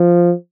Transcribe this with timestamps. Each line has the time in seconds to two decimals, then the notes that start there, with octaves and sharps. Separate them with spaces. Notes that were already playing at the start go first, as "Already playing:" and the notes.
Already playing: F3